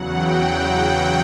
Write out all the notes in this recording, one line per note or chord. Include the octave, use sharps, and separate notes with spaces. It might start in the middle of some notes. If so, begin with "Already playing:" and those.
Already playing: E2 C#3 F#3 F#5
G5
G5